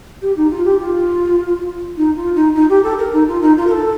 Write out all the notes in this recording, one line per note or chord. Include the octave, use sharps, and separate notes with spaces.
G4
D#4
F4
G4
F4
D#4
F4
D#4
D#4
G4
A4
A#4
D#4
F4
D#4
F4
A#4
A4